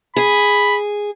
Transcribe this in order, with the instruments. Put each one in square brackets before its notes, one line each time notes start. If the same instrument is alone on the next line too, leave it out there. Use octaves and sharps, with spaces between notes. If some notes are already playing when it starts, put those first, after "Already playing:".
[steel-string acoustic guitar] G#4 [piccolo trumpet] B5